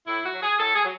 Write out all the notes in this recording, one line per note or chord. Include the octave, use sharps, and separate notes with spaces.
A2 E4
F#4
F#3
G#4
A2 A4
G#4
F#3